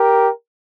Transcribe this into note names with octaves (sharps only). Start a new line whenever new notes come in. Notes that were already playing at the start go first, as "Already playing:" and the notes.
Already playing: G4 A#4